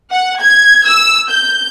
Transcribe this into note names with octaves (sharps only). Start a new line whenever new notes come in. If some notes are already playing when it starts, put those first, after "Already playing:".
F#5
G#6
E6
G6